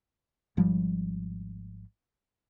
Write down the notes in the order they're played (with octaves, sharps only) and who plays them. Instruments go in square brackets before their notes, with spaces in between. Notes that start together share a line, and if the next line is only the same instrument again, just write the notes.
[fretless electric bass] G#1 G#2 F3 G3